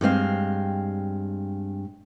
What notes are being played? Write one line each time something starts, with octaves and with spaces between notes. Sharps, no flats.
G2 G#3 C4 F5